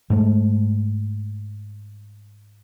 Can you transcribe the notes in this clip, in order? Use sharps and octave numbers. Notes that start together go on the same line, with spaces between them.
G#2 G#3 A3